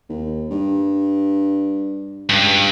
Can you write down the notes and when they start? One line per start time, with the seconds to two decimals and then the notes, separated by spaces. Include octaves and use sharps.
0.09 D#2
0.51 G2
2.29 C#2 G2